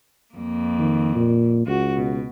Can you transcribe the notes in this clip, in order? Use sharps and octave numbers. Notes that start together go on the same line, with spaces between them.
F2 A#3
D#3
A#2
C#2 F#4
B2